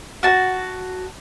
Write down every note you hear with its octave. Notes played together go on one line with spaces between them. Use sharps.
F#4 A5